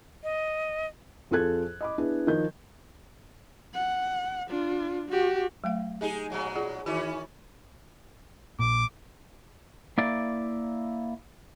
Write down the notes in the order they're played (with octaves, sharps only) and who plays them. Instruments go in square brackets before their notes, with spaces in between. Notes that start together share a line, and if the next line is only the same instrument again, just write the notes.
[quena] D#5
[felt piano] F2 F4 G#4 A4 F#6 G#6
D#5 B5 D6
B3 D4 E4 G#4
D#3 F3 D#5 G6
[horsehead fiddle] F#5
D4 F4
F#4 G4
[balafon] F#3 A3 F5
[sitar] G#3 D#4 G#4 [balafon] G4
[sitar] A#2 F#3 G#3
[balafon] F4 G#4 D5
[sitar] D#3 E3 C#4 [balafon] F#4
[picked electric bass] A#1 A#2 [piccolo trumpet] D6
[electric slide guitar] A#3 E4 D5